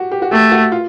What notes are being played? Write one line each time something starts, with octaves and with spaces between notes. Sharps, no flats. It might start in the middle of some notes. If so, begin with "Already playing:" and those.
Already playing: F#4 G4
G4
F#4
A3 G4
F#4
F4